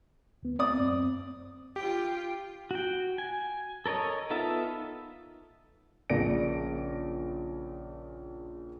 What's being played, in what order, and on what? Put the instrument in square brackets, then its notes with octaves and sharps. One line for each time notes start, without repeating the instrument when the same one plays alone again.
[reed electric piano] D2 B3
[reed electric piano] C4 [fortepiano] D5 D#6
[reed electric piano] F#2 C4
[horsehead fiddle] F4 G5 [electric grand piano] G4
[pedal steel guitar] F#4 G5
G#5
A4 A#4 C#5 D#5
B3 D#4 F4 A4 E5
[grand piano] A#1 C#3 A#3 D5 A#6 D7